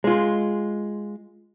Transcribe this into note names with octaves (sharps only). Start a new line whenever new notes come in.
G#3 F4